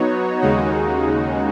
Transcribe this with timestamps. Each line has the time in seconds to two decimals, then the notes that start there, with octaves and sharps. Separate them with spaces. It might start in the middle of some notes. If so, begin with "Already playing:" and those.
Already playing: F#3 B3 D#4 F#4 C#5
0.42 D#2 C#3 G#3 D#4 F#4